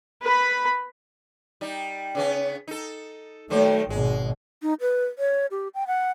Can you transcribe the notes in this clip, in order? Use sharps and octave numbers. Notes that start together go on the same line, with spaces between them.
B4 B5
G3 D#4
C#3 B3 C#4
D#4 A4
D#3 F#3 A3 C5
G#1 B2 G#3
D#4
B4
C#5
G4
G5
F#5